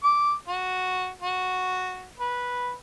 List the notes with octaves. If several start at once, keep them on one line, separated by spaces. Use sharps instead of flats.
D6
F#4
F#4
B4